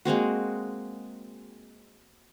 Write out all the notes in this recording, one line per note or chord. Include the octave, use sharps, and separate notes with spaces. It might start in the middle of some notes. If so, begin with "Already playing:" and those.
G#3 A#3 C4 F#4